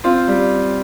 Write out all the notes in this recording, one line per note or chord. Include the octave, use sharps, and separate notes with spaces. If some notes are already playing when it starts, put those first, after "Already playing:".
C4 F4
G3